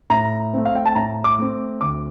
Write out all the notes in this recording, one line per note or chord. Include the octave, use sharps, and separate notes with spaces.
A2 A#5
A3 C4
F5
G5
A5
A2 A#5
D6
A3 C4
D2 D6